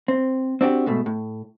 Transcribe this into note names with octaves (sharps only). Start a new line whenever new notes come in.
C4
C4 D4 F#4 G4
G#2 B2 A3
A2